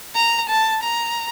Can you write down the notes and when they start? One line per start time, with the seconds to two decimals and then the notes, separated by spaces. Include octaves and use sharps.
0.15 A#5
0.49 A5
0.83 A#5